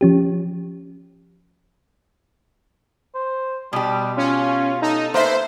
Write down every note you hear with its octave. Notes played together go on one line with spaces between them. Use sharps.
F3 C#4 G4
C5
B2 G3 G4
C#4 F4
D#4 A4
A#3 B3 C5 E5